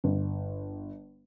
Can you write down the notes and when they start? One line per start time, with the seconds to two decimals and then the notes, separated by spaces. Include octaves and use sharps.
0.04 G1